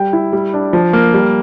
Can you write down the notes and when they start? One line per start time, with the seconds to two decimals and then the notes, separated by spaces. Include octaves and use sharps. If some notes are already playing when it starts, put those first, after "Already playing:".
Already playing: G3 G5
0.13 E4
0.33 G3
0.53 D4
0.73 F3
0.93 A#3
1.14 G3